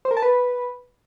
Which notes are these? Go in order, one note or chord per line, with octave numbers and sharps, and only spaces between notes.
C5
A#4
A5
B4